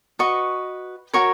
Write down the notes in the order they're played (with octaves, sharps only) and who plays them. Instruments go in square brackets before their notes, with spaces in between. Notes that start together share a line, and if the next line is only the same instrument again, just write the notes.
[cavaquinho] F#4 B4 D#5 C#6
F#4 A#4 C#5 C#6